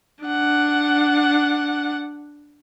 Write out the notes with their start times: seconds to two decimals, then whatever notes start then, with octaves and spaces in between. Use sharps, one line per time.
0.25 D4 F#5